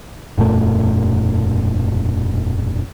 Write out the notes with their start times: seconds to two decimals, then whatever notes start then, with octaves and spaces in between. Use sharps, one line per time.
0.38 E1 F#2 A#2 A3